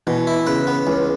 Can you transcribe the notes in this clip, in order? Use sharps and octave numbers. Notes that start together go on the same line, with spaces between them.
B2 E3
E4
C#3 B4
B3
C#2 E3